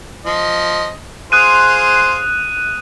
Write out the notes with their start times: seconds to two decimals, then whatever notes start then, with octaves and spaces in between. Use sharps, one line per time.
0.26 F3 D#5
1.32 F4 G#4 C5 D#6 F#6 D#7